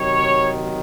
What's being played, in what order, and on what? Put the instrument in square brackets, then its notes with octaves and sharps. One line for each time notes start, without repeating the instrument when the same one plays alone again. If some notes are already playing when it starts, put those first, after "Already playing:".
Already playing: [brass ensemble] C3 D#3 F#3 C#5